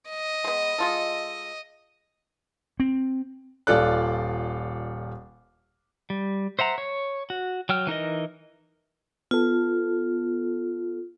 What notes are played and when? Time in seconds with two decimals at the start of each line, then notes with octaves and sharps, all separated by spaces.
0.10 D#5
0.44 G#3 B3
0.78 G#3 F4 A4
2.80 C4
3.67 D#1 F4 A4 D5 F#6
6.10 G3
6.59 C5 E5 F#5 A#5
6.78 C#5
7.30 F#4
7.69 F#3 G5 F6
7.87 E3 D#4 A#4 D#5
9.31 B3 F4 A4